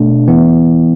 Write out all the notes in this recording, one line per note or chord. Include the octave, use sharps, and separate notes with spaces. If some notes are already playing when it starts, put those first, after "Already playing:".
Already playing: B2 A3 D4
E3 B3 E4